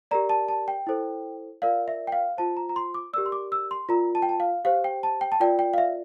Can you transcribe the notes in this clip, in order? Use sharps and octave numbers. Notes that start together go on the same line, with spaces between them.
G4 A#4 D5 A#5
A5
A5
G5
E4 A4 C5
F4 A#4 D5 F5
E5
G5
F5
F4 C5 A5
A#5
A#5
C6
D6
G4 A#4 D5 E6
C6
D6
E6
C6
F4 A#4 D5 A#5
A5
G5
A5
F5
G4 C5 F5
G5
A5
G5
A5
F4 A#4 D5 G5
G5
F5
E5